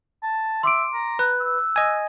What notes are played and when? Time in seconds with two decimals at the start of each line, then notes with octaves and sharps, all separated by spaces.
0.23 A5
0.63 E5 C6 D6 D7
0.93 A#5
1.19 B4 F#6
1.40 E6
1.76 D#5 G#5